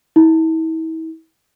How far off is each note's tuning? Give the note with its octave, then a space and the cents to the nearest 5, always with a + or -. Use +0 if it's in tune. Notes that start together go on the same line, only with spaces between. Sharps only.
E4 -40